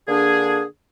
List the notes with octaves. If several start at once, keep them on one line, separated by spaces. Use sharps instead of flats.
D3 A#3 D4 G#4